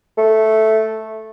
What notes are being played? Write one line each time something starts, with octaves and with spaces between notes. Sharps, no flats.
A3